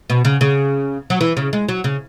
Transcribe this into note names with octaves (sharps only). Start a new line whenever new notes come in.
B2
C#3
C#3
F#3
E3
C#3
G#3
F#3
C#3